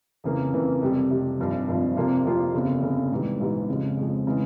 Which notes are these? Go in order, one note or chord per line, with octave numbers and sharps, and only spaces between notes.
F2 C#3 E3 A#3
F2 C#3 E3 A#3
F2 C3 G3
F2 C3 G3
G#1 G2 F3
G#1 G2 F3
F2 C3 F3 A#3 F4
F2 C3 F3 A#3 F4
G1 F2 C#3
G1 F2 C#3
A#1 G#2 E3 G3
A#1 G#2 E3 G3
F2 C#3 F3 G#3
F2 C#3 F3 G#3
C#3 E3 G#3